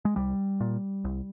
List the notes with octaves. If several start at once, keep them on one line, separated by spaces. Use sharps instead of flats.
G#3
C2 G3
A#2
C2